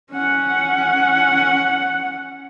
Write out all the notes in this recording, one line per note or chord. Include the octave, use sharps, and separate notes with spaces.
C#4 F#5